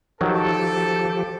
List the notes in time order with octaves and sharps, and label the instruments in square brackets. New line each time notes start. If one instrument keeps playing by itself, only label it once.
[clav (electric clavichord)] D#3 F#3 [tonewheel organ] F3 G4 [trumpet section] A4